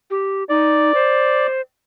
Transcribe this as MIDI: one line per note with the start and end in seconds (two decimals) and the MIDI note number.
0.10 0.44 67
0.49 0.92 63
0.49 1.47 74
0.94 1.61 72